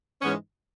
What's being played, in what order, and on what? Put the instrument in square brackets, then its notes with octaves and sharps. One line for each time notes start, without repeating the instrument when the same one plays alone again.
[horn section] G#2 E3 G#3 B3 C#4